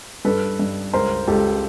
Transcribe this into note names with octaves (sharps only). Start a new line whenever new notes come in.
G2 A4 B4
G2
C#2 A#4 C5
C#2 G4 A4